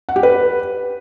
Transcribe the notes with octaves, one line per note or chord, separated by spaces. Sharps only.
F#5
G4
B4